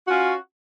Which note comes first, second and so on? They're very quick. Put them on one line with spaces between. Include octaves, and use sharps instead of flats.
F#4 C#4 F4